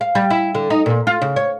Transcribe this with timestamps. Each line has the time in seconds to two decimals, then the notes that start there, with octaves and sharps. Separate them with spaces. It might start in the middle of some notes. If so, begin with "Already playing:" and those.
0.01 F5
0.15 G3
0.30 E4
0.55 D3
0.70 D#4
0.86 A#2
1.07 F4
1.21 C#3
1.36 C#5